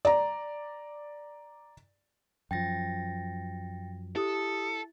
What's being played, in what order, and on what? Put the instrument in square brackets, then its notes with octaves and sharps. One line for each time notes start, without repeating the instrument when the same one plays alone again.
[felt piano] D5 A#5
[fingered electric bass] F#2 F3 [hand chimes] G5 A6 A#6
[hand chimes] E4 [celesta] G4 D#6 [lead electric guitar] A4